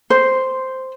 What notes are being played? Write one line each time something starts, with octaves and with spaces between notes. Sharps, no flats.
C5